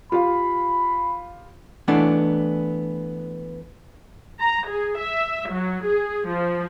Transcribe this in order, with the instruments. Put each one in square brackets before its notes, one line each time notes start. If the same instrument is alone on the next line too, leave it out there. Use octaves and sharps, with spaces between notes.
[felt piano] F4 G4 F5 [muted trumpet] B5
[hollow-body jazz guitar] E3 A3 B3 D4
[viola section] A#5
G#4
E5
F#3
G#4
F3